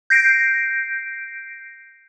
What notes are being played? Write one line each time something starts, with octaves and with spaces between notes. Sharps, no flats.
G6 A#6 C7 D7